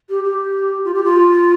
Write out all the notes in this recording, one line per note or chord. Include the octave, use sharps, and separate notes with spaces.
G4
G4
F4
G4
F4